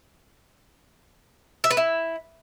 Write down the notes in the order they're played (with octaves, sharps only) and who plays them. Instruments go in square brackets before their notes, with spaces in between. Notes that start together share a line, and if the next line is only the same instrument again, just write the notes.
[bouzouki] E5
B4
E4